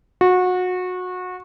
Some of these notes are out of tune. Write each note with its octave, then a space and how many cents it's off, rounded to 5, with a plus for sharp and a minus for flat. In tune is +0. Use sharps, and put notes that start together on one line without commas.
F#4 -25